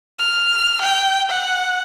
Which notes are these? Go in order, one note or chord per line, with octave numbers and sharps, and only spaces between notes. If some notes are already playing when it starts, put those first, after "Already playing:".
F6
G5
F#5